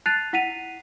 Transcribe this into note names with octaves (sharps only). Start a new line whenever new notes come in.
A5 F#6 A6 C7 D#7 F7
E4 F#5 B6 C7 D#7 F7